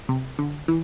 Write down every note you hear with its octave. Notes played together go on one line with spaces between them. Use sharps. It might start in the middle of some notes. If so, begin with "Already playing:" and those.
C3
D3
E3